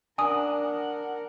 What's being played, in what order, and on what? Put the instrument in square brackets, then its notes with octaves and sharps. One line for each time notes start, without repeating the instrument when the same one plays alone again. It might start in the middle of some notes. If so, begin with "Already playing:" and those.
[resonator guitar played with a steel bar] D4 [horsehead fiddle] A#4 F#5 [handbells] G#5 D#6